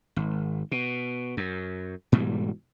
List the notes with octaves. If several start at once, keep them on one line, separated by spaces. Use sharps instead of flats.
G#1
B2
F#2
G#2 B2 E3 G3